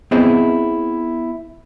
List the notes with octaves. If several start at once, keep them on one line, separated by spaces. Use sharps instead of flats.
B3 C4 E4 G#4 C5 D#5